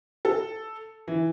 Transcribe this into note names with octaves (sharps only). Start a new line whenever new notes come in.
A4
E3